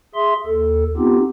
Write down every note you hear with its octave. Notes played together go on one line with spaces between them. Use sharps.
G#4 E5 C6
D#2 A4
B3 C4 D#4 F4 G4